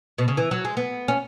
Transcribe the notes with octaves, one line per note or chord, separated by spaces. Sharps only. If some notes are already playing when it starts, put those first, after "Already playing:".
B2
C#3
E3
F#3
G#3
B3
C#4